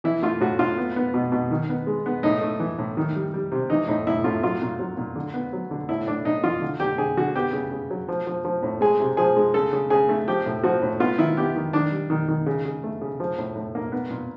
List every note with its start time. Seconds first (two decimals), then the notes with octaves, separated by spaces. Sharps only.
0.04 E3 E4
0.22 A3 F4
0.41 A2 F#4
0.59 A2 F4
0.78 B3
0.96 B3
1.14 B2
1.32 B2
1.51 D#3
1.69 B3
1.87 G#3
2.06 B3
2.23 A2 D#4
2.41 A3
2.60 E3
2.79 A2
2.97 D#3
3.15 G3
3.34 G3
3.52 C3
3.70 E3 D#4
3.87 A2 D#4
4.07 A2 E4
4.24 A2 F4
4.43 F#3 F4
4.62 A#2
4.79 F#3
4.97 A#2
5.16 D3
5.34 B3
5.53 F#3
5.71 D3
5.89 A2 E4
6.07 A2 D4
6.25 A2 D#4
6.44 E3 F4
6.62 D3
6.80 D3 G4
6.98 D3 G#4
7.17 D3 F#4
7.36 B3 G4
7.53 C#3
7.71 C#3
7.91 F#3
8.08 F3
8.27 F3
8.45 F3
8.63 A2
8.81 G#3 G#4
9.00 C3
9.17 F3 G#4
9.36 G#3
9.54 C#3 A4
9.73 C#3
9.90 C#3 G#4
10.09 A3
10.28 F3 G4
10.46 A2
10.63 F3 F#4
10.82 A2
11.00 B3 F4
11.18 D#3 E4
11.37 B3 G4
11.56 D#3
11.73 D#3 D4
11.92 G3
12.10 D#3
12.28 D#3
12.46 C#3
12.65 C#3
12.84 A3
13.01 C#3
13.20 F3
13.38 A2
13.56 A2
13.75 A#3
13.92 B3
14.10 A#2